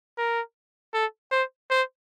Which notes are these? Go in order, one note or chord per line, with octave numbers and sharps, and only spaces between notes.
A#4
A4
C5
C5